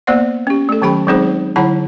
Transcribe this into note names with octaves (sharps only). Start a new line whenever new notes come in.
A#3 B3 C5 D5 F#5
C#4 G4
A3 A4
D#3 F#3 C#4 G4 G5 B5
F#3 G#3 C4 D#4 G#4 C5
D3 F#3 E4 C#5 F#5 B5